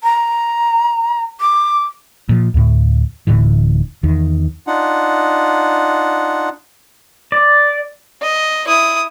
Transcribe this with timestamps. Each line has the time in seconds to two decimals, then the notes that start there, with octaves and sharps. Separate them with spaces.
0.03 A#5
1.40 D6
2.29 A#2 F3
2.54 D2 A2
3.27 D1 A2 D3 E3
4.03 E2 D#3
4.67 D4 D#4 F4 F#5
7.32 D5
8.22 D#5
8.68 E4 D#6